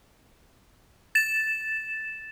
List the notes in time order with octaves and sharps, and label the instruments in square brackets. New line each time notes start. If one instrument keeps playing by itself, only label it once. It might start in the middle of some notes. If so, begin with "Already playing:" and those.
[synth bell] A6 E7